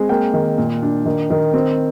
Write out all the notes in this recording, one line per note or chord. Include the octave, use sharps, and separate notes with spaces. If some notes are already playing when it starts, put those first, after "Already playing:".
Already playing: G#3 C4
A#3 G5
D#3
A#2
D4
D#3
D#3
C4